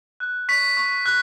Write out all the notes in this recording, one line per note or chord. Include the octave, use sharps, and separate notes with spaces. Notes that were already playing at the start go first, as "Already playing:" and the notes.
F#6
C#6 B6
C#6
F#6